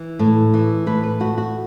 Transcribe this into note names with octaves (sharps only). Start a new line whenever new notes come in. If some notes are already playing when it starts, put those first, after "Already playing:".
Already playing: E3
A2
E3
A2 B4
B4
A3 F#4
F#4